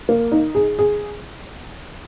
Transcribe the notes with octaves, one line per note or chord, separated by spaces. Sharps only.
A#3
D#4
G#4
G#4